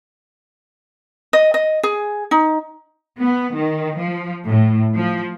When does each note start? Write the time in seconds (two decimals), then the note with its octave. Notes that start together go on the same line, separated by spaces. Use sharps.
1.33 D#5
1.54 D#5
1.83 G#4
2.31 D#4
3.21 B3
3.56 D#3
4.00 F3
4.49 A2
4.97 F3